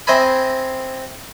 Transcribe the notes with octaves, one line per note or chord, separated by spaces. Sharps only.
C4 C5 D#5 E5 G#5 B5